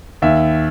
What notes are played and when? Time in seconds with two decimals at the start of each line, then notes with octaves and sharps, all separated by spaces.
0.22 D#2 E5